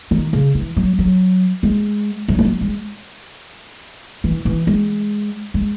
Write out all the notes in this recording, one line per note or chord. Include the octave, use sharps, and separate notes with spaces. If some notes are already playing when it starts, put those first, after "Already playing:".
D#3
C#3
E3
F#3
F#3
G#3
F#3
G#3
F#3
G#3
E3
E3
G#3
G#3